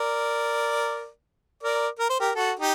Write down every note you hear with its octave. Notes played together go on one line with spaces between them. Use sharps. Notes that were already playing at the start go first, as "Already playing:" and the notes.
Already playing: A#4 D5
A#4 D5
A#4
C5
G4 A#4
F#4 A4
D#4 G4